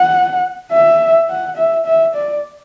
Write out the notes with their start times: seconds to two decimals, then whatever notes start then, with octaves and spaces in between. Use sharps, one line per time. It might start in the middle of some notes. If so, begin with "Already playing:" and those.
Already playing: F#5
0.72 E5
1.30 F#5
1.57 E5
1.86 E5
2.15 D5